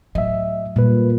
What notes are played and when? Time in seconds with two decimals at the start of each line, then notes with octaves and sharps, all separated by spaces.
0.15 A2 F#3 D#5 E5
0.76 A#2 G3 B4